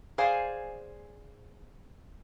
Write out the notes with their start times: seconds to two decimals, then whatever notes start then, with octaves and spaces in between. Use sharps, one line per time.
0.18 G#4 C5 D5 F5 G#5